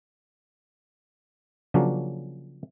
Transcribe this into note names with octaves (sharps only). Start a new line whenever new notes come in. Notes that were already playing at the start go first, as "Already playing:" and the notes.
C#3 F3 F#3 A#3 C#4 D4